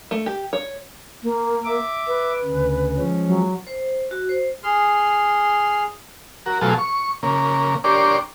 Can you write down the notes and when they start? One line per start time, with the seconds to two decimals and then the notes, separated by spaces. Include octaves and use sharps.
0.11 A3
0.26 G4
0.53 C#5
1.23 A#3
1.65 E5 D6
2.07 B4
2.45 D2 C#3
2.97 F3 G#3 C#4
3.27 F#3
3.67 C5
4.11 F#4
4.29 C5
4.64 G#4 C6 F6
6.46 F#4 A#4
6.61 B2 F#3 A3 F4 G#4 A4
6.78 C#6
7.23 C#3 A#3
7.84 D4 G4 A#4 C#5 D5 C6